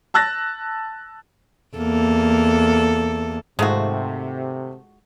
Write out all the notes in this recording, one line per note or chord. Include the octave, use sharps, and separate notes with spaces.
A5 E6 F#6 A6 A#6
E2 A#3 A4
G#2 C3 D#3 G#3 A3 F4 F#4 C5